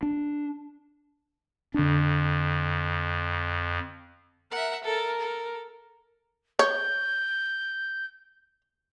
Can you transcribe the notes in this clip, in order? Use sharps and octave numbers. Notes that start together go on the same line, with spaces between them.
D4
F2 D3 D4
A#4 E5 F#5
A4 A#4 A5
A4
C#5 G6